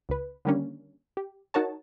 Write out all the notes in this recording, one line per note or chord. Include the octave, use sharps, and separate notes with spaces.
C#2 B4
D3 D#3 G3 A#3 C#4 D4
G4
D#4 F#4 A#4 C#5 A5